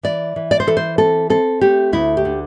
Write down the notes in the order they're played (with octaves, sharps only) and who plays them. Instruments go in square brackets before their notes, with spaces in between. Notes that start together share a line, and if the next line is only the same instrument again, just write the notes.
[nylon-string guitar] E3 D5
E3
D5
C5
E3 A4
C5
C4 A4
C4 A4
A3 G4
D2 E4
G4
D3